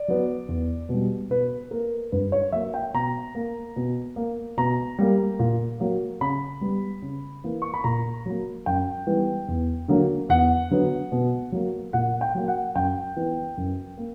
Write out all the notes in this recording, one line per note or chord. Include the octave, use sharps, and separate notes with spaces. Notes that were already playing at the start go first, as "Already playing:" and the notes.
Already playing: D5
F#3 B3
E2
B2
G3
B2 B4
A#3 A#4
G2 B4
C#5
F#3 A#3 E5
G5
B2 A#5
A#3
B2
A#3
B2 A#5
G3 A#3
A#2
F#3 A#3
C#3 B5
G3 B3
C#3
E3 A#3
C#6
B5
A#2 A#5
F#3 A#3
F#2 G5
E3 G3 B3
E2
D3 F#3 A#3
E2 F#5
D3 F#3 B3
B2
F#3 A#3
A#2 F#5
G5
F#3 A#3
F#5
F#2 G5
E3 B3
F#2
A#3